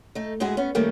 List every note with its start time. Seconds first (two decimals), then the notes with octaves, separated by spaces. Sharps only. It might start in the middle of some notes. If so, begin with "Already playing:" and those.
0.15 A3 D#4
0.40 G#2 G#3 E4 F#4 G#4
0.57 B3 C#4
0.75 D#3 G3 A3 A#3 C#4